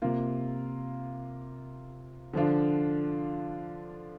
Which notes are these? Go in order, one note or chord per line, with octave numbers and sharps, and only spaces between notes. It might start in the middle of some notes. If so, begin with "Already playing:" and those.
C3 A#3 F4
D3 F3 D4 F4